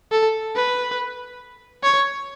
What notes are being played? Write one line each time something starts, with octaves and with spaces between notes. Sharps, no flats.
A4
B4
C#5